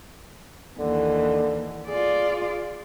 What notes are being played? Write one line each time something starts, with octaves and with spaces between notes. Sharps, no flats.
D#2 D3 E3
F4 G#4 D5